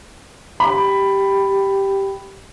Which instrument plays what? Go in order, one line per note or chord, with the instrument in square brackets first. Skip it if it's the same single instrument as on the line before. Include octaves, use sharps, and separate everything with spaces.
[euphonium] G4 [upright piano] B5